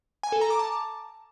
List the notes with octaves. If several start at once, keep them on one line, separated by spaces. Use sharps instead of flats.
G#5
A4
A#5
D6
A5